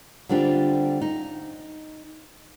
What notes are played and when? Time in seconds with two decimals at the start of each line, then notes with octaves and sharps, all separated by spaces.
0.29 D3 G3 C4 D4 F4 G4
1.01 D#4